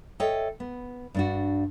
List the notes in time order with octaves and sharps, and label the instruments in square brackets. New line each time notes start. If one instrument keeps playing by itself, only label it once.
[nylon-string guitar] A4 C#5 D#5 E5 G5
B3
G2 D4 F#4